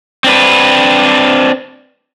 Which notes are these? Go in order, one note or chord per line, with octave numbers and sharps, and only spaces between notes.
C4 D4 B4